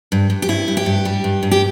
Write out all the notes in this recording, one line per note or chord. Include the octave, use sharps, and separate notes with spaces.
G2
G2
G4
G2 E4
G2
G4
G2
G3
G2
G2
G4